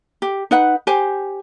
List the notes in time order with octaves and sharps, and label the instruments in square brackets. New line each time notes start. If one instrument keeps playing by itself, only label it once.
[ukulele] G4
D#4 B4 F#5
G4 C5 G#5